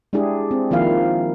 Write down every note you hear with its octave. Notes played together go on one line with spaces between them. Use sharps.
G#3 D4 E4 G4 G#4
C4
D#3 F3 A#3 E4 F5